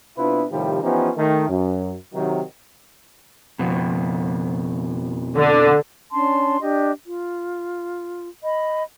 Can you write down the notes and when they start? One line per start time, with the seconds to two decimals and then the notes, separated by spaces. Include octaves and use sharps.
0.18 C3 B3 D4 E4 F4 B4
0.52 A2 C3 D#3 F3 G3
0.82 E3 F3 B3 C#4 D#4 G4
1.16 D#3 A3
1.48 F#2
2.14 C3 D#3 F#3
3.59 F2 B2
5.36 D3
6.12 C#4 D4 A5 C6
6.60 D4 G4 D#5
7.06 F4
8.43 D#5 B5